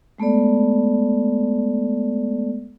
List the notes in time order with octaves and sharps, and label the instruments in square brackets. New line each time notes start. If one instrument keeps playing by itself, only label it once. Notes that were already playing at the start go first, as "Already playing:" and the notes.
[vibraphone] G#3 A3 B3 A4 D5